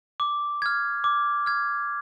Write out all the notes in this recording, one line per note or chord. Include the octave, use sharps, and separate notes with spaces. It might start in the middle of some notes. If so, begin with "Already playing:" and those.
D6
F6 G#6
D6
F6 G#6